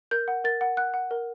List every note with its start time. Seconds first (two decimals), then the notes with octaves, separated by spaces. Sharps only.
0.11 A#4 G6
0.28 F#5
0.44 A#4 A6
0.61 F#5
0.77 F#5 F#6
0.94 F#5
1.11 A#4